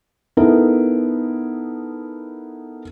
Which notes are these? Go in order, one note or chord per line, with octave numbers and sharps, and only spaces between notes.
B3 D#4 E4 A4 A#4